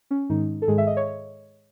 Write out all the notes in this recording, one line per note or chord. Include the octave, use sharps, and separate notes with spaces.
C#4
G#2 D#3 G#3 D#4
A4
G#2 D#3 G#3 G#4
E5
D#5
C#5